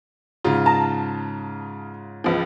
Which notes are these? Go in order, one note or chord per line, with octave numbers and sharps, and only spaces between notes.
G#2 C#3 F4
A5 A#5
C#2 E3 F3